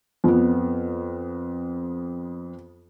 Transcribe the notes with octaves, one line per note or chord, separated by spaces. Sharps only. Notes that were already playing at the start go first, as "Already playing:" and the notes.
F2 B3